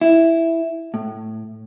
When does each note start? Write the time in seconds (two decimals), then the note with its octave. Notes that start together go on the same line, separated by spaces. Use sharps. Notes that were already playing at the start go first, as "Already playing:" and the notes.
0.01 E4
0.94 A2